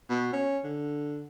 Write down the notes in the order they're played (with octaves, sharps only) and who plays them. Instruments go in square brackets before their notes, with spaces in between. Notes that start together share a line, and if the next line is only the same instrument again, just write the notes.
[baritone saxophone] B2
C#4
D3